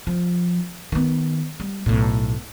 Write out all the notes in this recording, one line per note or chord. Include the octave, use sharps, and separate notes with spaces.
F3
D#3 B3
G3
B1 A2